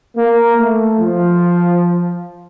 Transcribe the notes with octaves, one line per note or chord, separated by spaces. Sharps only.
A#3
A3
F3